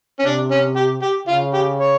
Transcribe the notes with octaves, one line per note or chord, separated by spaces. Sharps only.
C#4
C3 D4
C#4
G4
G4
C#3 F4
G4
C#5